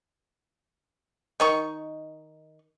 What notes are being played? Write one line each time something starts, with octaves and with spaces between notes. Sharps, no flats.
D#3 D#4 C#6